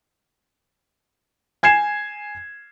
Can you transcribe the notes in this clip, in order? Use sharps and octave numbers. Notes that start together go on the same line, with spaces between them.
G#5 G#6 C7 E7